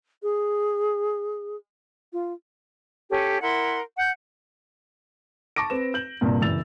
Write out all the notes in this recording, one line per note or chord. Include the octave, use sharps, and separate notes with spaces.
G#4
F4
C#4 G4 A4
E4 A#4 F#5 C6
F#5 G6
A5 C#6 D6 A#6 D7
C4 B4 E7
G6 F#7
C2 G2 A#2
F#1 E3 E6 A6 F7